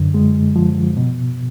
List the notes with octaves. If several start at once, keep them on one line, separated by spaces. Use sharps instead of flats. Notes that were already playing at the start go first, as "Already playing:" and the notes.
Already playing: F#2 D3
G#3
F3
B2